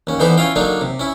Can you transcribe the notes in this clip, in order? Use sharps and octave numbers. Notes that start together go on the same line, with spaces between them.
D#2 C#4
D3 E3 B3 D#4 G4 C5
C#4 E4 F4 F5 G5
D3 F#3 A#3 D4 D#4
C3
C#4 E4